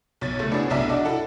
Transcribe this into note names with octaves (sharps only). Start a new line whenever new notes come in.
B1 C#5 A6
F#1 A3
B3 D4 E4 F#4 G#4 C#5
F1 B1 D4 E5 A5
D4 F#4 D5 D#5
E4 A4 F#5